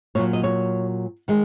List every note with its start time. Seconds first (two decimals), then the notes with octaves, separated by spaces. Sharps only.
0.15 A#2 C#5
0.19 F#3
0.33 D#5
0.43 C#5
1.28 D#3 G#3